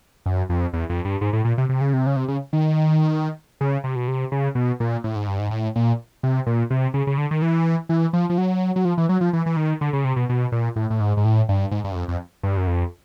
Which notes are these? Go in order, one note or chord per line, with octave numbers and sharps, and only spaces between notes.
F#2
F2
E2
F2
G2
G#2
A2
A#2
C3
C3
C#3
C3
C#3
C3
C#3
D#3
C#3
C3
B2
C3
C#3
B2
A#2
A2
G#2
G2
G#2
A2
A#2
C3
A#2
C3
C#3
C#3
D3
D#3
E3
E3
F3
F3
F#3
F#3
F3
E3
F#3
F3
E3
E3
D#3
D3
C#3
C3
B2
B2
A#2
A2
A2
G#2
G#2
A2
G2
G#2
G2
F#2
F2
F2
G2
F#2
F2